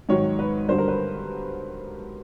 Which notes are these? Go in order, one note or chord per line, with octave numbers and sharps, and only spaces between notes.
G#2 D#3 F#3 C#5
B4
G2 D3 F#3 C5
A#4
B4